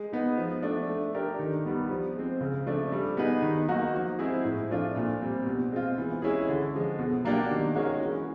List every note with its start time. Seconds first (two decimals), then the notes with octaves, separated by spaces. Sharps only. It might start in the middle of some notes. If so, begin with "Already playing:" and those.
Already playing: G#3
0.12 B3 D#4
0.37 F3
0.62 A3 D4
0.89 A3
1.14 D4 G4 A#4
1.39 D#3
1.65 G3 B3
1.90 F3
2.15 G#3 C4
2.41 C#3
2.66 F3 A3 D4
2.92 G3
3.17 B3 D#4 G#4 B4
3.42 D#3
3.68 F#3 A#3 D#4 F#4
3.94 F3
4.19 G#3 C4 E4 G#4
4.45 A2
4.69 F3 A3 D4 F4
4.96 A#2
5.21 G3 C4
5.46 B2
5.72 G#3 C4 F4
5.98 E3
6.22 G#3 C#4 E4 G#4
6.49 D3
6.74 F3 G#3
6.99 B2
7.25 F#3 A#3 D4 G4
7.50 D#3
7.75 G#3 C#4 F#4 A#4
8.01 E3